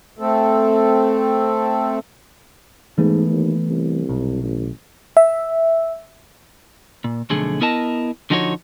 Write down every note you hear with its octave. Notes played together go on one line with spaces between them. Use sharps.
A3 C4 A4
G#2 E3 A3 B3
D#2
C2
B1
A1
E5
A#2
B1 F2 D3 A3 G#4
B3 E4 A#4 D#5 A5
D3 F3 D#4 F#4 G#4 C#5